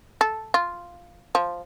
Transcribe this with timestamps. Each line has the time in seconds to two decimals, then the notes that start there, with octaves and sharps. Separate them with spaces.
0.21 A4
0.54 F4
1.35 F3